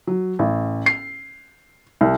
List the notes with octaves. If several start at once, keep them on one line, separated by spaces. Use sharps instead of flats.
F#3
A1
C7
C2